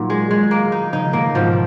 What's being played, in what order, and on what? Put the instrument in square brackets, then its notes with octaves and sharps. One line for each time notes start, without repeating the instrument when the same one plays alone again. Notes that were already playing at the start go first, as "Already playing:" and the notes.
Already playing: [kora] A#2 [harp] D#3 F#3
[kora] G#3
G#3
A#3
D#4
[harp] C#3 F3 [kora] D#4
[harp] B2 D#3 [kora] A#3
[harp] G#2 B2 [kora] F3